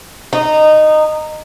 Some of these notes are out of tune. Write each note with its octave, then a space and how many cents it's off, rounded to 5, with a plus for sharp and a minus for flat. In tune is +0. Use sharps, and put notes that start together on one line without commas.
D#4 -15